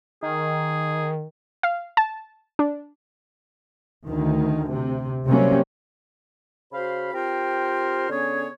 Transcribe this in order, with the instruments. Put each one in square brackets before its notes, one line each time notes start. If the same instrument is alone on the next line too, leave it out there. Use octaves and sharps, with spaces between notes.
[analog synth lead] D#3 [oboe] G#4
[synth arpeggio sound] F5
A5
D4
[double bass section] D2 D#3
C3
C3 F#3 G3 A#3 C4 C#4
[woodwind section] C#3 F#4 C5 F5 B5
C4 F4 G4 A#4 C5 G5
D3 B3 C#4 G#4 C#5